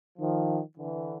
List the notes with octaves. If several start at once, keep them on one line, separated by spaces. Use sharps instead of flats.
D#3 F3
D3 E3